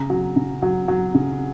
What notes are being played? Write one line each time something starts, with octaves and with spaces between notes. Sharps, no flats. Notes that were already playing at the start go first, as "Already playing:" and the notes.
Already playing: C#3 A#5
F#3
C#3
F#3
F#3
C#3